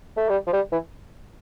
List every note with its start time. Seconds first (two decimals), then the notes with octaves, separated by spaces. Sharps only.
0.17 A3
0.29 G3
0.47 F3
0.53 G3
0.72 E3